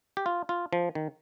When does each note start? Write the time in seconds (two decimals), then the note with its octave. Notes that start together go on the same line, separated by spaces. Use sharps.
0.17 G4
0.26 F4
0.49 F4
0.73 F3
0.95 D#3